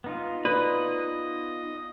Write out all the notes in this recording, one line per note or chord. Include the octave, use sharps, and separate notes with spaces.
B3 D#4 F4
B4 D5 D#5